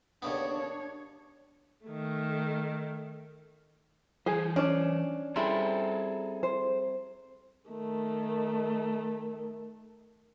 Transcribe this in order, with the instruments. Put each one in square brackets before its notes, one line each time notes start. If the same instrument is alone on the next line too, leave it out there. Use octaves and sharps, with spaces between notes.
[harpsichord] D#2 C#3 B3 [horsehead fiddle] D4 C#5
[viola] D#3 A3
[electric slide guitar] E3 C5 [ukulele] G#4
[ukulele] C#4 D5 [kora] D4
[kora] G3 C4 E4 [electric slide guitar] G#4 A4 A#5
[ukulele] C5
[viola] D#3 A3